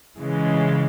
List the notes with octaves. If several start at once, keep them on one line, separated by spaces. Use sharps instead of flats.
C#3 E3 G#3